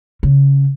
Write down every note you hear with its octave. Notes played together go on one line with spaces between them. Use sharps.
C#3